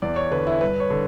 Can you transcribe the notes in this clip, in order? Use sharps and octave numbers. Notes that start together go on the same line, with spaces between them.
E2 D5
C#5
D3 B4
E4
G2 B4
C#5
D3